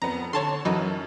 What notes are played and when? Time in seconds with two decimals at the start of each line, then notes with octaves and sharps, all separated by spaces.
0.02 F2 B3 A#5
0.33 D3 C#5 A5 C6
0.65 F#2 E3 F#3 D#4